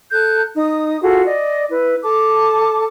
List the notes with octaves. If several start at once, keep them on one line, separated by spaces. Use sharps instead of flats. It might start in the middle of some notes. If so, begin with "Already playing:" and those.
A4 F#6 G6
D#4 D#6
F4 F#4 G#4 A4
D5 D#5
E4 B4
A4 A5 D6